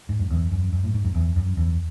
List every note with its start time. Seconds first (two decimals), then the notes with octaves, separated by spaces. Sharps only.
0.09 G#2
0.19 F#2
0.30 E2
0.52 F#2
0.72 F#2
0.83 A2
0.94 G#2
1.05 F#2
1.15 E2
1.36 F#2
1.57 E2